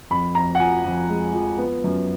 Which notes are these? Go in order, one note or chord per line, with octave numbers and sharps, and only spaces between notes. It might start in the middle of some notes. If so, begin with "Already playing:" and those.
F2 B5
F2 A#5
F#5
F3 G#5
F2
G#3
F3
B3
F#2